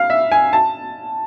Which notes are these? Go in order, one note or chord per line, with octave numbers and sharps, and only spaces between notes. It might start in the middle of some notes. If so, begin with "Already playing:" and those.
Already playing: F5
E5
G#5
A5